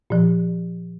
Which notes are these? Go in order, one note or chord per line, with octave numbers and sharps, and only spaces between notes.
A#2 F3